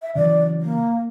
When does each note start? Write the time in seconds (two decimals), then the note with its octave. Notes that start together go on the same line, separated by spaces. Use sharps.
0.02 E5
0.15 C#3 E3 F#3 D5
0.61 A#3